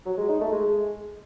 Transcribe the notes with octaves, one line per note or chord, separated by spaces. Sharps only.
F#3
G#3
D#4
A3
G#3